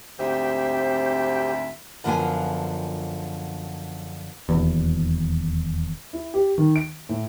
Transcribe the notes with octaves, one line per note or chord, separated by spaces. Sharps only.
D2 G#2 C4 G4 C5 E5
F#2 D3 F3 B3 F4 G#5
D#1 G#1 E2
E4
G4
D#3
D7
A2